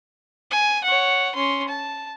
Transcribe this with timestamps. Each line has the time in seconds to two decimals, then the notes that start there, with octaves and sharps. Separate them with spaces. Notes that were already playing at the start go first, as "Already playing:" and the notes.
0.51 G#5
0.84 C#5 F#5
1.35 C#4 C6
1.68 A5